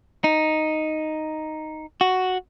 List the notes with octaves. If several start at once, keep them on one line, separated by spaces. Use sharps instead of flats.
D#4
F#4